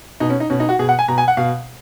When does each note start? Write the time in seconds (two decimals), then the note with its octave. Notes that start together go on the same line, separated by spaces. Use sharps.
0.20 B2 D#4
0.30 C#4
0.40 D#4
0.50 B2 C#4
0.60 D#4
0.69 F#4
0.79 B2 G#4
0.89 F#5
0.99 G#5
1.08 B2 A#5
1.18 G#5
1.28 F#5
1.37 B2 F5